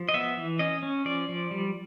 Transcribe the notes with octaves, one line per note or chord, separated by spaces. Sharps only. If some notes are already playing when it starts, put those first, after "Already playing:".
Already playing: F3
D#5
B3 E5
E3
C#4 D#5
C#4
F3 D5
F3
G3